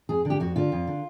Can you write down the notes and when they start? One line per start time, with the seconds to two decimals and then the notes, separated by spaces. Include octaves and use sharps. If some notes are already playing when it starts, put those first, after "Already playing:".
0.09 F2 G#4
0.25 D3
0.30 G4
0.40 F2 F#4
0.56 D3 F4
0.72 F2
0.87 D3